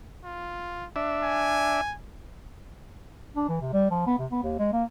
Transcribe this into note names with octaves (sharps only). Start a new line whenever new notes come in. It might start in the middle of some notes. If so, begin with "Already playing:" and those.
F4
D4 E5
G#5
D4
E3
C3
G3
F3
B3
C3
B3
D#2
G#3
A#3